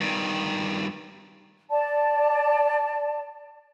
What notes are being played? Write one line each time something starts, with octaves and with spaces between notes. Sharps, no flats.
G2 D#3
D5 A5